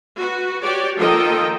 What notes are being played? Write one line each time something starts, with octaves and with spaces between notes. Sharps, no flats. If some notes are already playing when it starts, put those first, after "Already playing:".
F#4 B4
F#4 G4 C#5 D5
D#3 F3 A#3 A4 D#5 G5